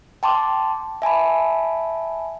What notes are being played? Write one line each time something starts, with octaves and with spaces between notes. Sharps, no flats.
G5 A5 C6 D6
E5 G#5 A5 B5